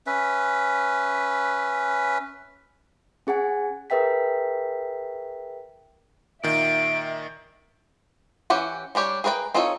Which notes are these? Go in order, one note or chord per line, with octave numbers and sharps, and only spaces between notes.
C#4 B4 E5
C#4 G#4 F#5 G#5
G#4 A#4 B4 E5 G5 B6
A#2 D#3 E5 D7
E3 C#4 G4 F#5
G3 D4 G4 C#5
G#4 A#4 B4 D5 G5
C4 D#4 F4 A4 C#5